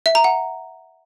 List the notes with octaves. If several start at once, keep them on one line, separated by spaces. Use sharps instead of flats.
E5
A#5
F#5